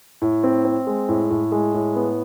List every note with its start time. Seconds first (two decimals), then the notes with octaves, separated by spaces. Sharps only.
0.22 A2
0.44 C4
0.65 C4
0.87 G#3
1.09 A2
1.30 A2
1.52 G#3
1.74 A2
1.96 B3